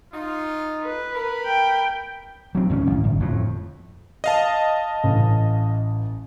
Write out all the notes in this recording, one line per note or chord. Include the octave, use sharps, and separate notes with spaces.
D#4 F4
B4
A#4 B5
G5
F#3 C4
G#1 C#2 D#3 C#4
A1
G1
F2 A2
D#5 F5 A5
A1